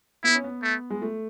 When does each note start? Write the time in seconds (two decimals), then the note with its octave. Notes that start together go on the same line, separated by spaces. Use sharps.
0.24 B3 E4
0.35 C#4
0.44 B3
0.63 A3
0.90 G#3
1.02 A3